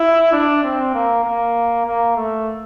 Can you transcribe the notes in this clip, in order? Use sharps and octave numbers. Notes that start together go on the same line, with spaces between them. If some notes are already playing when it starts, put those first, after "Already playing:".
Already playing: E4
D4
C4
A#3
A#3
A#3
A3